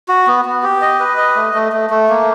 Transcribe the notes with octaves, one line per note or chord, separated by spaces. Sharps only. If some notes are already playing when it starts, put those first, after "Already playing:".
F#4
B3
B3
G4
D#5
B4
D#5
A3
A3
A3
A3
A#3